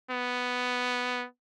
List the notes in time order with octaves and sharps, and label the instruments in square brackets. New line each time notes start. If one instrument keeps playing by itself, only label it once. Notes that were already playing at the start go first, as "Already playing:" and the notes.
[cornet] B3